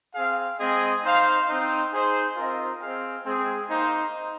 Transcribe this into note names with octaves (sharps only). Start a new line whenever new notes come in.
C4 G#4 F5
G#3 C4 G#4 D#5
D#4 C5 F5
C4 D#4 C5
D#4 G#4 C5
C4 F4 A#4 D#5
C4 G#4 F5
G#3 C4 G#4
A#3 D#4 C5